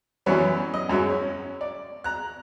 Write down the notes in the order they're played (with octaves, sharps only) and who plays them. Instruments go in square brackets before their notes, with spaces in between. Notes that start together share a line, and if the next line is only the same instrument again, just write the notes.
[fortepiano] F#2 E3 F#3 G3 B3 C#4
D#5
F#2 F#3 G#3
C#4
D5
A#5 F#6